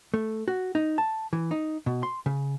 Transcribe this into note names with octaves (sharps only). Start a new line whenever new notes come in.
A3
F#4
D#4
A5
E3
D#4
B2
C6
C#3